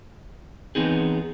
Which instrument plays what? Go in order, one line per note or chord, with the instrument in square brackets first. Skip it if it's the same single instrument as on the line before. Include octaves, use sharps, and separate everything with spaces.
[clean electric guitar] E3 B3 C4 D#4 G#4